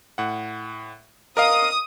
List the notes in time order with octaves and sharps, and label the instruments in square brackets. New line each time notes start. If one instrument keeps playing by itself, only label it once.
[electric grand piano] A2 F#5
[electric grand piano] A#4 D#5 F5 [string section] D#6